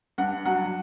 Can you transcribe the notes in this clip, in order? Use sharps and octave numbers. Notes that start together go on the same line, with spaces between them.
G2 F#5
F#3 F#5